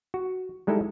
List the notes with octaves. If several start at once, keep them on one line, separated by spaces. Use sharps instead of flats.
F#4
G3 G#3 D#4 E4 A4